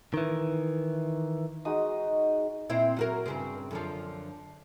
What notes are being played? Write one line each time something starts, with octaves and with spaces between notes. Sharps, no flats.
D#3 E3
G#3 D#4 F#4 D#6
A#2 C4 E4
F#3 F#4 A#4
G2 C#3 C4
F#2 D3 F3